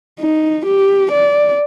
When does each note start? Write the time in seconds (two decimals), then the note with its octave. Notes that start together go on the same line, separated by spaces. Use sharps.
0.19 D#4
0.66 G4
1.11 D5